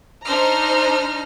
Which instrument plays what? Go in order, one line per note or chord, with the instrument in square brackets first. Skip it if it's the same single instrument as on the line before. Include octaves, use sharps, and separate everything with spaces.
[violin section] D4 D#4 C5 A#5 F6